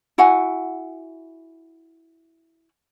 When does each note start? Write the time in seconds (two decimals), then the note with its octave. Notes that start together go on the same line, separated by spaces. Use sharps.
0.18 E4 F#4 F#5 G#5